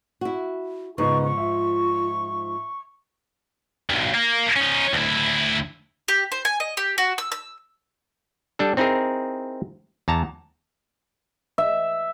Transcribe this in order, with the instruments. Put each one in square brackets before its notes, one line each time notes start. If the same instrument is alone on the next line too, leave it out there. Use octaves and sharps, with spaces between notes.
[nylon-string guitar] E4 F#4
[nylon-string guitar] G#2 F3 [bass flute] C#3 [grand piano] B3 D#4 [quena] C#6
[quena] C#6
[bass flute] F4 [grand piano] E5
[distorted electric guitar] B1 G2
A#3
C#4 D#4
D2 E4
[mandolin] G4
C5
G#5
D#5
G4
F#4
E6
E6
[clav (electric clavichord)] G3 D4 A4
C4 D#4 E4 G#4 A#4
E2 A5 A#5
[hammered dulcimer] E5